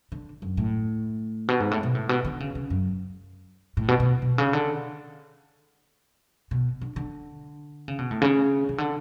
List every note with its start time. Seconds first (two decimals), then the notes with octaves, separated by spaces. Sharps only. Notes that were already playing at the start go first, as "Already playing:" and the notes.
0.12 D3
0.42 F#2
0.57 A2
1.48 B2
1.60 G#2
1.71 A2
1.83 B2
1.95 A2
2.09 B2
2.25 D3
2.40 C#3
2.55 C#3
2.70 F#2
3.77 A2
3.88 B2
4.00 B2
4.22 B2
4.38 C#3
4.53 D3
6.51 B2
6.81 D3
6.96 D3
7.88 C#3
7.99 B2
8.11 A2
8.21 C#3
8.69 C#3
8.78 D3